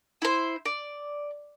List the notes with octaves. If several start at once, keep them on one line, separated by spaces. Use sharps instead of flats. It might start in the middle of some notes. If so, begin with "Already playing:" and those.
E4 C5
D5